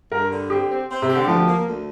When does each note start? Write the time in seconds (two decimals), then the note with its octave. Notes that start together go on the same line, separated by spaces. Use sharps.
0.12 G2 A#4
0.31 D3
0.50 C4 G4
0.70 C4
0.89 C4
1.02 C3
1.09 G4
1.15 D3
1.27 D2 F3
1.47 A#3
1.66 D2